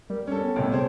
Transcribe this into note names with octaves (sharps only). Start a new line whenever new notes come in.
G3 A#4
C#4 A4 C#5
B3
A1 C3 G5
G#4 C5 C#5